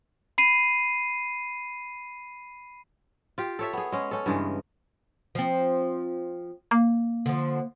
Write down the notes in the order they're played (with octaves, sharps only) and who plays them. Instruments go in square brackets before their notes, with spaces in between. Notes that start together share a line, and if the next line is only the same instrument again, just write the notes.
[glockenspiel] B5 C7 D#7
[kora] F4 G4
A4 C#5 E5
B3 G#4
G#3 C#4
C#4 A4
G2 C#3 E3 G#3
[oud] F3 C4
[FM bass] A#3
[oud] D3 F3